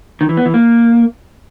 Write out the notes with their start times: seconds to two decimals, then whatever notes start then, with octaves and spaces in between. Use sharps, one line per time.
0.21 D#3
0.29 E3
0.37 B3
0.46 E3
0.54 A#3